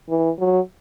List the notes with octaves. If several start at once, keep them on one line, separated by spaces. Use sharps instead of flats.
E3
F#3